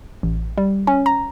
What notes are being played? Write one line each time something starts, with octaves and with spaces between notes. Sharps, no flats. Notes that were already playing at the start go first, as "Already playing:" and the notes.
A1
G3
C#4
A#5